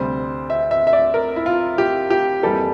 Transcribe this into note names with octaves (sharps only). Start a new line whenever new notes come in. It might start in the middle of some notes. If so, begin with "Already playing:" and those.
Already playing: D2 C3 G3 C4 C5
E5
E5
E5
D5
A#4
E4
F4
G4
G4
F2 E3 G3 A#3 A4